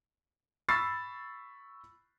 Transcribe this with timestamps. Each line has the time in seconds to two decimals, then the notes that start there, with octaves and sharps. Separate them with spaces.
0.69 B5 C#6 E6 A6 C7